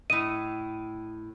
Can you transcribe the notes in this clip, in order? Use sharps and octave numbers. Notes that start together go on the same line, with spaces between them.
A2 D#5 D#7